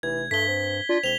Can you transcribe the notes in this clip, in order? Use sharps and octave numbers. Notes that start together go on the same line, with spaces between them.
F1 E3 G#6
G2 A3 B6 G7
C4
D4 F4
E1 C4 F7 G7